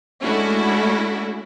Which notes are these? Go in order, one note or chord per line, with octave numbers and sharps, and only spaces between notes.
G#3 A3 C#4 D4 E4 F#4